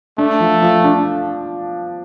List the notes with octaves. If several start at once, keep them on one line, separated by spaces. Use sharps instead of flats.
A3 D4
F3
F3
D4